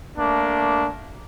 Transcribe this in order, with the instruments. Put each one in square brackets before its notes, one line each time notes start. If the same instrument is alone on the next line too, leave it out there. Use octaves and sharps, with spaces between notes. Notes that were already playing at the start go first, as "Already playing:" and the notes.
[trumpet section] A3 A#3 D4